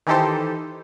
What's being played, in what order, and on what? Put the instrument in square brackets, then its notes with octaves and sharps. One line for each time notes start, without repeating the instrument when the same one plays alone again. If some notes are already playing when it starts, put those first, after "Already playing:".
[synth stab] D#3 E3 D#4 G4 A4 C5